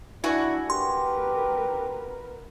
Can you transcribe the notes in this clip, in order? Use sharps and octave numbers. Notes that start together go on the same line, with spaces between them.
D4 E4 F#4 G#5
G4 A#4 B4 C6